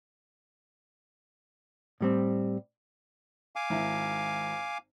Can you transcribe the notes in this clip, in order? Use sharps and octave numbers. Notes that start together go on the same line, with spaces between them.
A2 G3 C4
F5 G#5 D6
G#1 E4